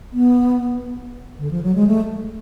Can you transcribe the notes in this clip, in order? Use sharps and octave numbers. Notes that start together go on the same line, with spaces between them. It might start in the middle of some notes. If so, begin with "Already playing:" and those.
B3
D3
F3
F#3
G#3
A3